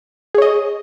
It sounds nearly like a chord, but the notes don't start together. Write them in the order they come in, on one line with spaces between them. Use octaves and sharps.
G#4 C#5 D#5